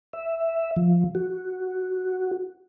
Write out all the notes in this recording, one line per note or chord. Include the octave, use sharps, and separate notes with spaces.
E5
F3
F#4